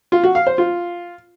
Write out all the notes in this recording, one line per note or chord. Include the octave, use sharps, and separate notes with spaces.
F4
F#4
F5
C5
F4